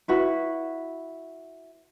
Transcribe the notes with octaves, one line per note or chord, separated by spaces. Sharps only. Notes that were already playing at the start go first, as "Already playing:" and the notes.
E4 F#4 B4